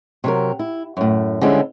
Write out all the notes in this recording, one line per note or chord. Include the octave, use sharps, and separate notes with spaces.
C3 F#3 A#4
E4
F#2 A2
D3 G3 G#3 C4 C#4 E4